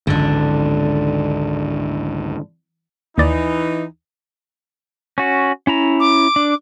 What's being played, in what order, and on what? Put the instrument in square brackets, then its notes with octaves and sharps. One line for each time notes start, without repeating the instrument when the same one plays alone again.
[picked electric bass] G#1 C#2 [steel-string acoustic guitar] D3 D4
[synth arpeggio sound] D#2 D5 [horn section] E3 D#4
[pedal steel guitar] C#4 F#4
C#4 E4 A#5
[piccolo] D6
[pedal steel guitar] D4